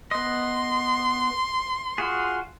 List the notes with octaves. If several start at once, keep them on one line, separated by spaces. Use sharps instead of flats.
B3 D#5 C6
F4 F#4 G#4